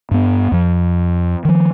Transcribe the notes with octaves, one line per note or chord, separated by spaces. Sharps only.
G2 B3
F2 F3
D#3 F3